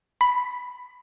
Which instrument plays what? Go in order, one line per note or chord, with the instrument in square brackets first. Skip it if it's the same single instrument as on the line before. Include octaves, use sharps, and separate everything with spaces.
[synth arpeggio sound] B5